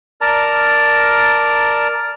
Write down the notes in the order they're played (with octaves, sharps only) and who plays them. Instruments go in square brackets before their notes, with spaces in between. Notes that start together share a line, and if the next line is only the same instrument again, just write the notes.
[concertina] A#4 D5 A5 A#5